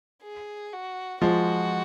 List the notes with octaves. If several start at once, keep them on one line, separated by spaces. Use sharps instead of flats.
G#4
F#4
F3 G#3 F#4